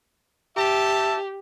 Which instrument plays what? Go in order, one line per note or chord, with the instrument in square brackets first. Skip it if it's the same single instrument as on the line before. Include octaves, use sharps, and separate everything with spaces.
[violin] G4 [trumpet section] E5 A5